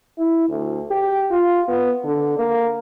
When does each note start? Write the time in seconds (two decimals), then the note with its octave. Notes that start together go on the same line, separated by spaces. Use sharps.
0.18 E4
0.49 D2
0.91 G4
1.31 F4
1.69 B3
2.04 D3
2.38 A#3